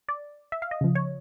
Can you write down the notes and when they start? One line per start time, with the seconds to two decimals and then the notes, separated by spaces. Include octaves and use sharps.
0.09 D5
0.52 E5
0.62 F5
0.71 D#5
0.81 C#3 F3
0.95 C#5